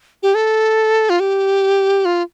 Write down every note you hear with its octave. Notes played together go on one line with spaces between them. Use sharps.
G4
A4
F4
G4
F4